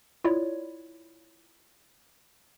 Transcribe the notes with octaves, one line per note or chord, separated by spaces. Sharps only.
E4 F4 C#5 D5